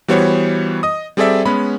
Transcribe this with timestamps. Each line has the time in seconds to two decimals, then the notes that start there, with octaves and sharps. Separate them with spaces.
0.08 E3 G3 B3 F#4 C5 C#5
0.83 D#5 D#6
1.17 G3 C4 G#4 A4 D5 E5
1.45 G#3 B3 C#4 B5